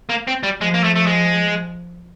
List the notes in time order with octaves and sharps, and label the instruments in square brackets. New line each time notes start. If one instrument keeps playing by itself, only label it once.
[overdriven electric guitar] A#3
C4
G3
[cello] F3 [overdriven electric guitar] G#3
[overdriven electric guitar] A#3
A3
A3
G#3